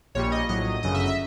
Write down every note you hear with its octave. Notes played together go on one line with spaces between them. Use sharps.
A#1 A#2 G3 C#5
D#5
A#1 A2 F#3 D#5
G1 F#2 C#3 D#5
E5
D#5
E5